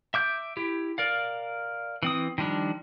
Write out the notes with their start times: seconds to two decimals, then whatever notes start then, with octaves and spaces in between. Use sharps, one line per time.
0.14 E5 D6 G6
0.57 E4 G4
0.98 A#4 D5 F5
2.03 E3 C4 D#6
2.38 D#3 F3 G3 D4